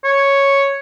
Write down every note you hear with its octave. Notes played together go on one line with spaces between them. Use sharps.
C#5